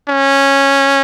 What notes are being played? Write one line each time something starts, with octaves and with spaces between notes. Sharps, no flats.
C#4